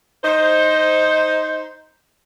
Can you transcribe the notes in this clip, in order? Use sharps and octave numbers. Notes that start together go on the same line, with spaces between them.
D#4 C5